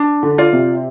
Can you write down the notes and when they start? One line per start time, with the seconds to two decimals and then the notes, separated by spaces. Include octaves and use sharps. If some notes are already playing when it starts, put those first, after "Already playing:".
Already playing: D4
0.23 D3
0.38 F4 D5
0.53 C3